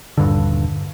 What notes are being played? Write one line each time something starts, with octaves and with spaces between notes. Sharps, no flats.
D#1 G2 D3